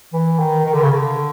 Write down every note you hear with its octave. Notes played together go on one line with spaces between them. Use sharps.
E3
D#3
D#3
D3
C#3
D3